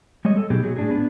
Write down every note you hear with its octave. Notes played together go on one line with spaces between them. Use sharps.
G3 G#3 C#5 D#5
A4
B2 F#3 B3 D#4 G4 G#4
F#3 G#4
A2 D4 G#4
B3 D4